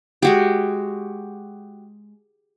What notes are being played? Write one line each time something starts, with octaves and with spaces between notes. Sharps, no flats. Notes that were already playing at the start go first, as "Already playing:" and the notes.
G#3 F#4 G4